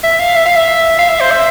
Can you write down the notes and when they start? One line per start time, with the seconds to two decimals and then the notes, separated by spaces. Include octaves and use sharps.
0.04 E5
0.20 F5
0.36 E5
0.46 F5
0.56 E5
0.99 F5
1.09 E5
1.20 C5
1.31 E5